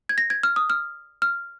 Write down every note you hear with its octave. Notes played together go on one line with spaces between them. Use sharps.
G#6
A#6
G#6
F6
D#6
F6
F6